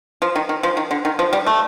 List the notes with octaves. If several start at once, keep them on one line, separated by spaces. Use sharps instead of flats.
F3
D#3
D#3
F3
D#3
D3
D#3
F3
G3
A3